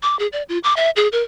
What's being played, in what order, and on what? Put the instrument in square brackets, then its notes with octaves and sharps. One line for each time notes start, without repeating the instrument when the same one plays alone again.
[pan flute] D6
G#4
D5
F4
D6
E5
G#4
A#4